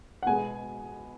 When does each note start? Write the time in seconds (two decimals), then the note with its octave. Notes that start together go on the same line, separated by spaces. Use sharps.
0.23 F#5
0.26 B2 G#3 B3 G#5